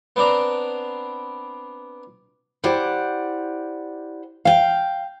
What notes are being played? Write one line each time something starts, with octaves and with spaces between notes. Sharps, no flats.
B3 C4 D4 A#5
E4 G4 C5 D5 F#5
F5 G5